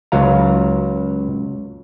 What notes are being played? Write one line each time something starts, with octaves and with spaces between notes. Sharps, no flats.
C#2 F#3 F5 A#5